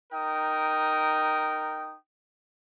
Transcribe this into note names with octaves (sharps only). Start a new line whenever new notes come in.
D#4 A#4 G5 D#6